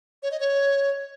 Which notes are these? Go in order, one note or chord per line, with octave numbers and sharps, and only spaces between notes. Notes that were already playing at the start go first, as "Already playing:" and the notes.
C#5
D#5
C#5